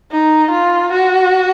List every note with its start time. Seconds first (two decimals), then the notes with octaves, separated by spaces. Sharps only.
0.11 D#4
0.51 F4
0.92 F#4